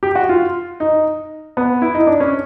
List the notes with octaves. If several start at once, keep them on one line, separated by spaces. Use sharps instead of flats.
G4
F#4
F4
D#4
B3
E4
D#4
D4
C#4